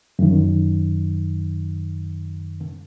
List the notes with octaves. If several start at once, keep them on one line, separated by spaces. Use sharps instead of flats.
F#2 D#3